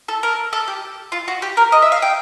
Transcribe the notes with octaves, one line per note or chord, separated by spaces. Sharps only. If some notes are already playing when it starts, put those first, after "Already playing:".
A4
A#4
A4
G4
F4
F#4
G4
A#4
D#5
E5
F5
G5